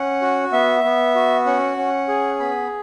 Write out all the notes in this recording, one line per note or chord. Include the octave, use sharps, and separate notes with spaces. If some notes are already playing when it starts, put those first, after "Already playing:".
Already playing: C#4 F#5
F#4
B3 E5
B3
F#4
C#4 F#5
C#4
G#4
B3 B5